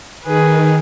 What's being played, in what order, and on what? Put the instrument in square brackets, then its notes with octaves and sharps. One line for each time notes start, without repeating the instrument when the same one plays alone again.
[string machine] D#3 [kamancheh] G#4 B4